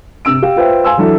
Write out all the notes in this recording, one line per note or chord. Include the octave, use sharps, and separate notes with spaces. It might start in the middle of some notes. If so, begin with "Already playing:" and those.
C3 E6 D7
G4 F5 G5
F4 B4 C5 E5 G5
F5 G#5 C6 E6
E3 F#3 D4 E4 A4